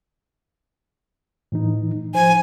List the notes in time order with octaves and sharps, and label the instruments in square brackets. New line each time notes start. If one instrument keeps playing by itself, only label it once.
[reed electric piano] A2 E3 D#4
[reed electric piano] F3 C5 [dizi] G#5